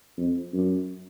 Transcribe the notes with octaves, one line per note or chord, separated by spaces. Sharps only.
F2
F#2